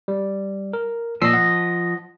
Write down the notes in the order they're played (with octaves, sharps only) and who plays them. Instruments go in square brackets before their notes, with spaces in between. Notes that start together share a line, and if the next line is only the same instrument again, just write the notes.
[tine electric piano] G3
A#4
[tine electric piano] A#2 E6 C7 [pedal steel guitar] F3 D#5
[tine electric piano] F#5